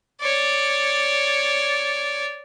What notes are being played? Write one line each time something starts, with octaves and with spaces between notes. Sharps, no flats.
C#5 D5